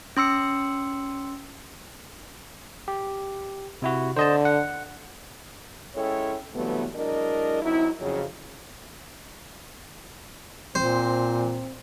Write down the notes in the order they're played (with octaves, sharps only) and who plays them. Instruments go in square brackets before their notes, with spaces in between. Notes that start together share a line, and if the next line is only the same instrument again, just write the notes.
[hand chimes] C#4 C6 E6 C#7
[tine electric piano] G4
C3 E4 F#4
[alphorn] D3 [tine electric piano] C5 D#5 A5
[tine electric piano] F#5
[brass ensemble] G#3 C#4 E4 A4 C#5 G5
G2 C3 E3 F#3 A3 B3
F#3 G#3 D4 E4 A#4 D#5
F#3 C4 D#4 E4
F2 C#3 F#3
[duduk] A#2 [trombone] C4 [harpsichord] C5